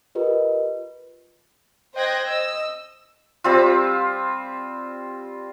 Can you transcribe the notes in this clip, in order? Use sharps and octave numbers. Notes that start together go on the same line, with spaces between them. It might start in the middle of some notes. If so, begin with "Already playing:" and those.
F4 G4 A#4 B4 D#5
C5 D#5 G5 F#6 G#6 A#6
D#5 E6
G3 C4 F4